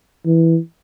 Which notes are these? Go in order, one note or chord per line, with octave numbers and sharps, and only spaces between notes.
E3